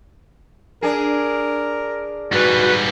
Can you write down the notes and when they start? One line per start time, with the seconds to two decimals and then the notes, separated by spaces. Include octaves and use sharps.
0.82 D4 G#4 A#4
2.32 G#2 G3 F#4 B4